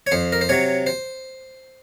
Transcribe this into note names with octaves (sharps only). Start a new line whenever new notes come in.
C#5
F2 C5
A#4
C5
C3 F#3 C#5
C5